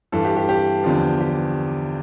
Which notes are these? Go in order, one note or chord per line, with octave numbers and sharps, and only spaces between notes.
G2 E3 A4
G4
G4
G4
E2 D3 F3
G4